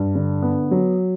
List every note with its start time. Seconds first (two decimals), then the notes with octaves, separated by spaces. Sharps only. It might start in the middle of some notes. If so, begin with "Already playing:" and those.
Already playing: G2
0.15 D3
0.43 B3
0.71 F#3